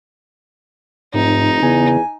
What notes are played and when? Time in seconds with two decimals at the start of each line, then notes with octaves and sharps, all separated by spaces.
1.14 F1 G#2 D#4
1.63 E2 C#3 B3 G#5